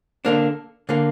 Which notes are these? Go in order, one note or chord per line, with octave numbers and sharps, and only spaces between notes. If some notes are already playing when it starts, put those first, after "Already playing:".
D3 A#3 D4
D3 A#3